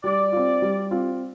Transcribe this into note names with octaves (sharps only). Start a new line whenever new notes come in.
G3 D5
C4 F4
G3
C4 F4